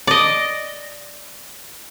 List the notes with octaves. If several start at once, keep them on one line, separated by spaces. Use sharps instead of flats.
D5 D#5